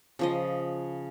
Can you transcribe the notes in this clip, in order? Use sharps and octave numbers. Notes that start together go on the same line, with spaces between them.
C#3 F3 D#5